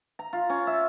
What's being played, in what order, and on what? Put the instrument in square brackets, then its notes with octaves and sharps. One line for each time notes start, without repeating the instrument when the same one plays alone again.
[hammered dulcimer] A#5
F4
C#4
E5